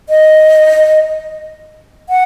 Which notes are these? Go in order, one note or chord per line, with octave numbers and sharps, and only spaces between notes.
D#5
F#5